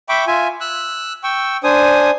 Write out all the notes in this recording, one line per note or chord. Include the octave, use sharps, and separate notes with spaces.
E5 G5 B5 C#6 D6
F4 E5 G#5
E6 F#6
G5 C#6 E6
D4 C5 G#5 D#6